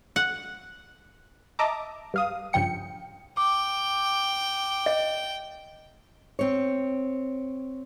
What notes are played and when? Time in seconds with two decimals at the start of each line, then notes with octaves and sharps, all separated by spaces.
0.16 F#5
1.59 D#5 E5 A5 A#5 D6
2.14 G2 F5 D#6
2.53 G2 C#3 F3 G5 C#7
3.37 G5 D6
4.86 D#5
6.39 C4 C#5